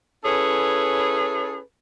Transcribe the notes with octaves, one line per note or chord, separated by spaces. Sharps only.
C#4 E4 G#4 A4 B4 C#5